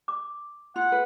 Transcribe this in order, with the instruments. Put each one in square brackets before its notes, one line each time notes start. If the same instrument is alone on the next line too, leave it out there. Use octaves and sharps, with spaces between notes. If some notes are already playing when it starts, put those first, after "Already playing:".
[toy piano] D6
[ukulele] F4 [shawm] F#5
[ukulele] B4